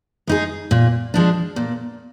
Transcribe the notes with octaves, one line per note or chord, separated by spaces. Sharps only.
G#3 D#4 G#4
A#2
F3 G#3 D4
A#2